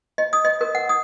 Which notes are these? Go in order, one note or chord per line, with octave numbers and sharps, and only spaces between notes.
D#5
D#6
D#5
A#4
F#5
D#6